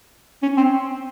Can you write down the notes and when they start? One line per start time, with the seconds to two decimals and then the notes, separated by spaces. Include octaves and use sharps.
0.43 C#4
0.57 C4